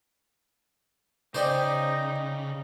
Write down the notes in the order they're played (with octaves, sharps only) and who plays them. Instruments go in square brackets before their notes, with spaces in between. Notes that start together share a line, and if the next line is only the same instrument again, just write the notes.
[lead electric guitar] C#3 [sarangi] D#4 [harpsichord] C5 D5 G5